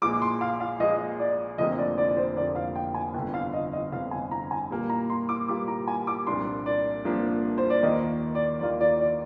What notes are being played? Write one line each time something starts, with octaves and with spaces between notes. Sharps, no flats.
A#1 A#2 G#3 D6
C6
F5
F5
A#1 A#2 G#3 D#5
D5
F1 F2 D3 F3 A#3 D#5
D5
D5
D5
C5
F1 F2 D3 F3 A#3 D5
F5
G5
G#5
G1 F2 D3 G5
F5
D#5
D#5
G1 F2 D3 F5
G#5
A#5
G#5
A#2 G3 A#3 F4
A#5
C6
D6
A#2 G3 A#3 F4 D6
A#5
G#5
D6
C2 A#2 F3 A#3 D4 C6
D5
C2 A#2 F3 A#3 D4
C5
D5
D#2 D#3 A#3 F4 D#5
D5
D#2 D#3 A#3 F4 D5
D5
D5